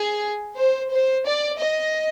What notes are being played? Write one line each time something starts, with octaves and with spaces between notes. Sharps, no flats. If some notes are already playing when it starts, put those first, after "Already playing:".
Already playing: G#4
C5
C5
D5
D#5